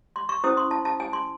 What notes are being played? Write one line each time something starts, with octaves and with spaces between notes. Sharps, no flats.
C6
C#6
C#4 E4 C5 D#6
C6
A5
A5
G#5
C6